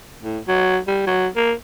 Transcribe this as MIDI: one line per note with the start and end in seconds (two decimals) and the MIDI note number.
0.22 0.39 45
0.48 0.79 54
0.87 1.06 55
1.07 1.28 54
1.36 1.53 58